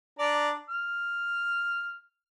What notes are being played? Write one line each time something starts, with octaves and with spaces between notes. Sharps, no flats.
D4 D5 A#5
F6